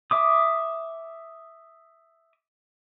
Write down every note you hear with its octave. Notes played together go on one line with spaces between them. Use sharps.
E5 D6 D#6